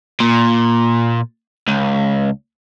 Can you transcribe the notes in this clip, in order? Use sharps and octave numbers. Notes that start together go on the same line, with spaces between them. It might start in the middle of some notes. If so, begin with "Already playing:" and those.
A#2
C#2